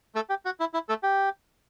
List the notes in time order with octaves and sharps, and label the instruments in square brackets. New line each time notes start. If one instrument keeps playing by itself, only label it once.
[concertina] A3 A4
G4
F#4
E4
E4
A3 A4
G4